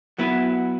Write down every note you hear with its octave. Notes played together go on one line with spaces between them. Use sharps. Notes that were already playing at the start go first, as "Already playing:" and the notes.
F#3 B3 E4 B4